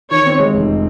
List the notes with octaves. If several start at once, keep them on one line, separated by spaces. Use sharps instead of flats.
D#3 C#5
C4
G#3
F1